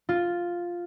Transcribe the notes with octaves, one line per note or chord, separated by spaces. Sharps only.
F4